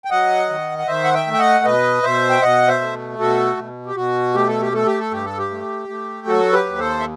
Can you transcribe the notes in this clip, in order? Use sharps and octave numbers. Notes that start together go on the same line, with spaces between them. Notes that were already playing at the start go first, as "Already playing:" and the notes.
G5
F#3 D#5 F#5
D#3
F#5
D#3 C5 E5
F#5
E5 G5
A3
G5
D#5 F#5
B2 B4 D#5
B2 C5 E5
G5
B2 D#5 F#5
C5 E5
A3
B2 F#4 A4
B2
G4
B2 F#4
A3 G4
A4
G4
A3 A4
G4
A4
G2 G4
A4
G4
A3
A3
F#3 F#4 A4
G4 B4
D#2
A4 C5
E5